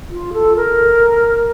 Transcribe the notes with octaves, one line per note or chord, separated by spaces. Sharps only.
F4
A4
A#4